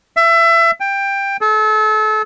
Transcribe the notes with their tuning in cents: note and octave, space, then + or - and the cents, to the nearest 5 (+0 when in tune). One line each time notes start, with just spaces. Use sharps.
E5 +25
G5 +15
A4 -35